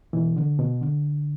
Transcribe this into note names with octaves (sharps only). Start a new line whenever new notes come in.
B2 E3
D3
B2
D3